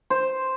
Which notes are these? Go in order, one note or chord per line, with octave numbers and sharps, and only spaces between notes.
C5